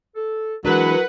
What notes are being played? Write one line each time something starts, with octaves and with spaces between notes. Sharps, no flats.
A4
E3 F#3 G#3 D4 A#4 B4 F#5